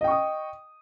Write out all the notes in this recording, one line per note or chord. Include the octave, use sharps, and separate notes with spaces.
D#5 G5 C#6 D#6